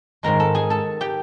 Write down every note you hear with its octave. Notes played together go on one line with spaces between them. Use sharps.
G#2 D#3 G#3 A#4 A#5
A4 A5
G#4 G#5
A4 A5
G4 G5